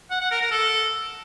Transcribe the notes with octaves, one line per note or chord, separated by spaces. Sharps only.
F#5
F#5
A#4
A#4
A4